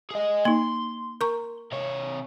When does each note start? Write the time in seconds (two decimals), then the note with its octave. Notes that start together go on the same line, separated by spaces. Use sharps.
0.11 G#4 D#5
0.45 A#3 D#4 C6
1.21 A#4 A#5 C#6
1.72 C3 C#5